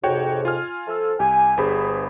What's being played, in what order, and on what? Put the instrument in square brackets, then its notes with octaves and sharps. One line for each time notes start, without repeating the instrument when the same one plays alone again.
[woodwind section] F2 G#2 C3 [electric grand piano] F#4 C#5 G5
[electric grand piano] F4 G#5 F6
[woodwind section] F3 A4
[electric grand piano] C2 G4 [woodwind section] G#5
[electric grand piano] G1 C5 B5 [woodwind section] G2 G#4